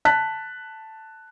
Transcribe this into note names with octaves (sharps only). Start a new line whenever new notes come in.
A5 F#6 B6